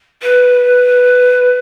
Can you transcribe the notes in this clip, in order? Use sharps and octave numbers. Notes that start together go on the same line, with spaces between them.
B4